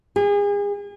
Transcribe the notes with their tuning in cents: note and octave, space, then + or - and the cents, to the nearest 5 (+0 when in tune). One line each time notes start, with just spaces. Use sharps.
G#4 -35